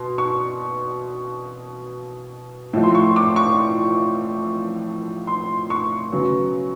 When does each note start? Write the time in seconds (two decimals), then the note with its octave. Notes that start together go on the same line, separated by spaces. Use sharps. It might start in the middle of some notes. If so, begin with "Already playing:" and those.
Already playing: B2 C6
0.18 C#6
2.73 A2 F3 A3
2.83 C6
2.95 C#6
3.16 D6
3.36 C#6
5.27 C6
5.70 C#6
6.12 C#3 F#3 B3